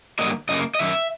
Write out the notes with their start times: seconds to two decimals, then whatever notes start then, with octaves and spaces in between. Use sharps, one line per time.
0.19 G2 D3 F#3 A#3 D#5
0.49 F#2 C#3 A#3 D#5
0.75 D#5
0.79 F#2 D#3 E5